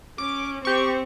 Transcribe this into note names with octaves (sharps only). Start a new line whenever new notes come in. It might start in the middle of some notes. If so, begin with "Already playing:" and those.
C#4 D6
C4 G4 C#6